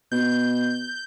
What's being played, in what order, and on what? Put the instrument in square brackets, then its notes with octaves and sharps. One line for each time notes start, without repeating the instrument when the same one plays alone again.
[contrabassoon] B2 [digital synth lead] G6